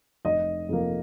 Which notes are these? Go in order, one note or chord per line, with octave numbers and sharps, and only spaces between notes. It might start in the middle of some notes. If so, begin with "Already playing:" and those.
F1 D#5
F2 F3 A#3